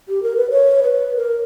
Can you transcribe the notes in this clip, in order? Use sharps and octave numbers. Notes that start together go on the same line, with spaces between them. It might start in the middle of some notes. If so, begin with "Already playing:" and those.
G4
A#4
B4
C#5
B4
A#4